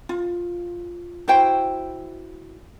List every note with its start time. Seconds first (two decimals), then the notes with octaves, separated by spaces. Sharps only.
0.09 F4
1.28 E4 F#4 C5 G5